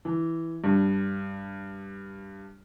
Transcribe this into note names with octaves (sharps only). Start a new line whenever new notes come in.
E3
G2